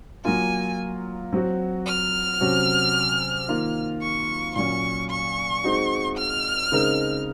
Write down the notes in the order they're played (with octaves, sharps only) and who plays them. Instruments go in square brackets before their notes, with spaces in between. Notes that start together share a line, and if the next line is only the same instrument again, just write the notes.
[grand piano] F#3 A#3 F4 [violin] G#5
[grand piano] F#3 C4 F#4
[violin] F6
[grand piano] C3 F#3 C#4 F#4
D#3 A#3 F4
[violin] C#6
[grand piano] A#2 F#3 C#4 [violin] C#6
[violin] C#6
[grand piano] G#3 C4 D#4 F#4
[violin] F6
[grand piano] C#3 G#3 C4 D#4 A#4